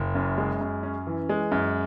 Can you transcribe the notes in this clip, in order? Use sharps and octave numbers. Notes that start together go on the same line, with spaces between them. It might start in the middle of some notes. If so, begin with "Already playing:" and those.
Already playing: F#1
F#2
G#3
F#2
C#4
E3
G#3
F#2